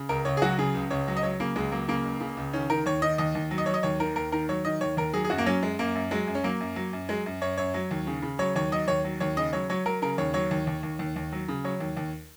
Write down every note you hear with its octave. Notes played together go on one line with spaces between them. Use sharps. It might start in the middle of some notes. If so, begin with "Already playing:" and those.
Already playing: C#3
C#2 A#4
C#2 C#5
G#4
F#3 F#4
C#3 G#4
C#2
C#2 C#5
F#3
D#5
F#3 C#5
C#3 A#3
C#2 G#3
F#3 A#3
C#3 A#3
C#2
C#3
C#2
D#3 C#4
D#3 A#4
D#2 C#5
D#3 D#5
D#2 D#5
D#2
F#3
D#5
F#3 C#5
D#5
D#2 C#5
D#3 A#4
D#2 A#4
D#3 A#4
F#3 C#5
D#3 D#5
D#2 C#5
D#2 A#4
F#3 G#4
G#4
F#2 F#4
A#3
F#3 C#4
F#2 G#3
F#2 A#3
F#2
F#3 G#3
F#2
C#4
F#3 A#3
F#2
F#3
F#2
F#3 G#3
F#2
F#2 C#5
F#2 C#5
F#3
D#2
C#3
C#3
F#3 C#5
D#2 C#5
F#3 D#5
D#2 C#5
F#3
D#2 C#5
C#3 D#5
F#3 C#5
F#3 C#5
F#3 A#4
C#3 A#4
D#2 C#5
F#3 C#5
D#2
D#2
D#2
D#2
D#2
F#3
C#3
F#3 C#5
D#2
D#2